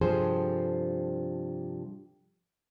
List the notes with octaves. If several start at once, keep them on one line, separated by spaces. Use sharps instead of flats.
G2 C3 F3 G#4 A4 C5